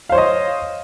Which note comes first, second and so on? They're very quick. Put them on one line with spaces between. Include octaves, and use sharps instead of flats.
F5 C5 C#5 D#5